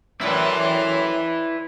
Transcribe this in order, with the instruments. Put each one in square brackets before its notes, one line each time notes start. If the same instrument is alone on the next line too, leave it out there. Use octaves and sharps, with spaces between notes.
[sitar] F#2 A2 [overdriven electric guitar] E4 B4 [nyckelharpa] D5 C6